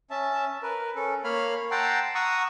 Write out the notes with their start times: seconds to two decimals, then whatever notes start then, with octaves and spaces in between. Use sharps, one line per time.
0.10 C#4 E5 A5
0.63 A#4 B4
0.96 C#4 A4
1.24 A#3 C#5 F5 B5 F6
1.71 F#5 G5 A5 A#5 C6 E6
2.15 F#5 A#5 C#6 D#6 E6